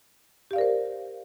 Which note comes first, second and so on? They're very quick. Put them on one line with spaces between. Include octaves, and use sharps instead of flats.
G4 F5 D5 A#4 C5